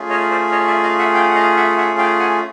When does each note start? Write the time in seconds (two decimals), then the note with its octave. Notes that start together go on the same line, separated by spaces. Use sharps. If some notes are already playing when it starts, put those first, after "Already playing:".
Already playing: A3 C#4 F4 G#4
0.10 C#5 D#5
0.31 C5 D5
0.52 C#5 D#5
0.68 D5 E5
0.83 D#5 F5
0.99 E5 F#5
1.15 F5 G5
1.29 F#5
1.36 D#5 F5
1.57 E5 F#5
1.78 E5 F#5
1.98 F5 G5
2.19 F#5 G#5